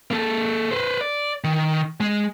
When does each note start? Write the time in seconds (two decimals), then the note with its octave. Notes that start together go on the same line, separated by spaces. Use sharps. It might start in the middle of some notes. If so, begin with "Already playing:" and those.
0.11 A#3 A4
0.71 B4 C5
1.01 D5
1.44 D#3
2.01 G#3